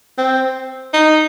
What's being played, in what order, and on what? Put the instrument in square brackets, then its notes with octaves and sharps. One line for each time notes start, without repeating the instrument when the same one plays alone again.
[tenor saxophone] C4
D#4